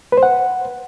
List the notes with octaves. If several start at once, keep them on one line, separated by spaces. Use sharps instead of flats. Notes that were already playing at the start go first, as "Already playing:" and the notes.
B4
C5
F#5